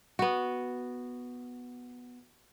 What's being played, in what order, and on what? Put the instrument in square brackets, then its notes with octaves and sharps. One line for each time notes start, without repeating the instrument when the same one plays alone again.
[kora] B3 F#4